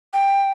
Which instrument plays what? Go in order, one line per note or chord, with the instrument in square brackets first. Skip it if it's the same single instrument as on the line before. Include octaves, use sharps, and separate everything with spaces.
[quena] G5